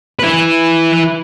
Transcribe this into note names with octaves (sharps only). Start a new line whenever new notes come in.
E4 B4